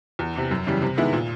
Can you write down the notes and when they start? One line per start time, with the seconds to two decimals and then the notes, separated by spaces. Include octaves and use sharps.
0.19 E2
0.36 C3 E3
0.51 F#2
0.67 C#3 E3 G3
0.82 C3
0.98 D#3 G#3 B3 E4
1.13 A#2